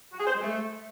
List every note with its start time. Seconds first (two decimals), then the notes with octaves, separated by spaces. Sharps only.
0.12 F#4
0.20 G#4
0.27 C5
0.35 G#3
0.42 A3